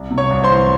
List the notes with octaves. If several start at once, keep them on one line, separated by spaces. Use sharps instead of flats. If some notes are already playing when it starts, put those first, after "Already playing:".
Already playing: C2
C3
C#5 C#6
C2
C5 C6
E3